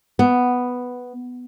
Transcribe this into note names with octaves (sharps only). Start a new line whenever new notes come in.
B3